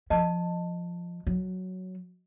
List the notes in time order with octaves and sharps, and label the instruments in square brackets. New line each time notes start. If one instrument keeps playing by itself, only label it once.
[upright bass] F3 [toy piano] D#5 A5
[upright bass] F#3